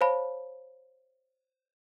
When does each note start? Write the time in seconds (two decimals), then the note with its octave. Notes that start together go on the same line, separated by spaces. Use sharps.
0.01 C5 C#5 F5 A5 B5